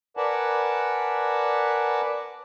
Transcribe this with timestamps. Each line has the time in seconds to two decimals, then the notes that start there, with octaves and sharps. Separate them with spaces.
0.17 A#4 B4 D5 F#5 G#5 A5